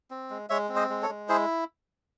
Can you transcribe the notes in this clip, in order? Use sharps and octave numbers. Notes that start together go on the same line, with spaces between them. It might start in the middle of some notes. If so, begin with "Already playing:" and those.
C4
G#3
G#3 C#5 E5
C4
C5 D#5
G#3
A4 C#5
G#3
E4 G#4 C5